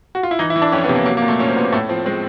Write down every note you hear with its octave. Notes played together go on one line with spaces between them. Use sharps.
F#4
F4
E4
E3 D#4
E4
E3
D4
F2 C#4
B3
C3
A#3
F#3 A#3
A#3
A#2
A3
A#2 C#4
C4
A#2 B3
A#3
A2 A3
F3 C4
G#3 C4